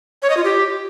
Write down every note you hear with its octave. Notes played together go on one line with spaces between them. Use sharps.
C#5
D#5
F4
G4